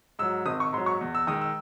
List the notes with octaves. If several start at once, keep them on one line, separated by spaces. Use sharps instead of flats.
G#2 F#3 E6
G#1 D#6
C#6
G#2 F#3 C6
C#6
E2
E6
D#3 G#3 D#6
E6